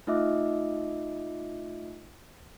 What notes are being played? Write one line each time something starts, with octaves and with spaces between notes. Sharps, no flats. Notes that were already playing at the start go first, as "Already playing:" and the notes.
A3 D#4 F4 D#5 E5 D6